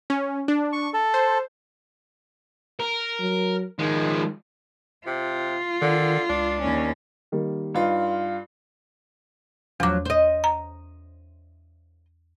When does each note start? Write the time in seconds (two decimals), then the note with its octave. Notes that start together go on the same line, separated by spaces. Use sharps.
0.10 C#4
0.48 D4
0.73 C#6
0.94 A4
1.14 C5
2.80 A#4
3.20 F#3
3.79 D#3 F3 G#3
5.07 C3 F4
5.82 D3 D#3
6.29 C#2 D4
6.61 D#2 C#4
7.32 D#3 G3 A#3
7.75 G2 D#4 F4 B4
9.80 E2 F3 F#3 D6
10.05 C5 D#5
10.44 A#5